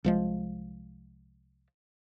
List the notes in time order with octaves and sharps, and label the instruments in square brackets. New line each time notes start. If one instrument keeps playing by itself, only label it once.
[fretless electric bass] C2 F3 G#3